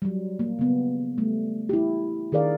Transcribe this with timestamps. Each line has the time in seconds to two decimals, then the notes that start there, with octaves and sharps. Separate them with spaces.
0.02 F#3 G3
0.39 A#3
0.59 C#3 B3
1.18 G3 A3
1.69 E4 G4
2.32 D#3 G#4 A#4 D5 F5